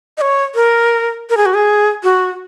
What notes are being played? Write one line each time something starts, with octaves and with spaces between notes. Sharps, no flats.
D#5
C#5
A#4
A#4
G#4
F#4
G#4
F#4